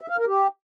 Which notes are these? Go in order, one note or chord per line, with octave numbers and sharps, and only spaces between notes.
E5
F5
A#4
G4